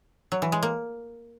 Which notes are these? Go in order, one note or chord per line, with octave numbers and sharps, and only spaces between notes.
F#3
E3
G#3
A#3